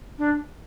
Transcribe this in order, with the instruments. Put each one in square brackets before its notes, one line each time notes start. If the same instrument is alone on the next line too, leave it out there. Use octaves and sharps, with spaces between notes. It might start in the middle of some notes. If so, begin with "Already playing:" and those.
[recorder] D4